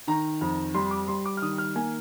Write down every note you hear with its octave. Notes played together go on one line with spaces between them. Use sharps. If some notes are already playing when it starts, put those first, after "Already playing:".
D#3 A#5
F2
G3 C6
D6
G3 C6
D6
F6
D#3 D#6
F6
A#3 G#5